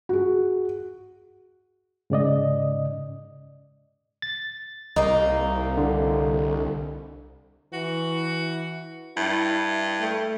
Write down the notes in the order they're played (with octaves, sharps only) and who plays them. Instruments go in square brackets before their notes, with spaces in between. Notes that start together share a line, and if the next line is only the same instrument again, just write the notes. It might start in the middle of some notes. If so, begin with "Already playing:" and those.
[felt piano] F#4 G#4
[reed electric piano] G#2 C#3 D5 D#5
[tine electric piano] A6
[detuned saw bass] C2 [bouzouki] A#3 D#4
[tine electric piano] D3
[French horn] E3 [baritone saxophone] F#4
[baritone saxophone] G2 [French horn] E4
[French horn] A3